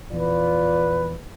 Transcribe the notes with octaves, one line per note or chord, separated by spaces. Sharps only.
A#1 E2 E3 F4 B4 D5